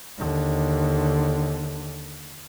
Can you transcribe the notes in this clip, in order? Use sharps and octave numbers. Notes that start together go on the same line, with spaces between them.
D#2 D3